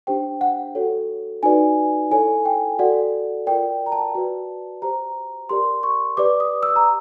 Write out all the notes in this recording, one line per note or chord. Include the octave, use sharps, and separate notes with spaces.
D4 G4 C5 G5
F#5
F#4 A4 C#5
D#4 F#4 B4 D5 G#5
E4 A4 C#5 G#5
G5
F#4 A4 D5 F#5
F4 A#4 D5 G5
A#5
A5
F#4 B4 D5
G4 C5 A#5
G4 A#4 D5 C6
C#6
G4 B4 D5 D6
D#6
E6
A#5